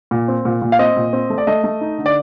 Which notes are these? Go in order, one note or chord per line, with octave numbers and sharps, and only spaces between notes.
A#2
C4
A#2
A#2
F5
C4 D#5
A#2
C4
A3
D5
A3 D#5
A3
D#4
D3
D5